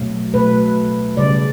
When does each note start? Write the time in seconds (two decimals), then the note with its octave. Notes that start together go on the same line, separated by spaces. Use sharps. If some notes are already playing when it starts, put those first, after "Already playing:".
Already playing: B2 F#3 A3
0.33 B2 A3 B4
1.17 C#3 G3 D5